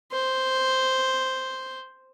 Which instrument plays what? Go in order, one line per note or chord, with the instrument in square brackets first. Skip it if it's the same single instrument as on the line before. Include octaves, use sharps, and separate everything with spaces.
[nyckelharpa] C5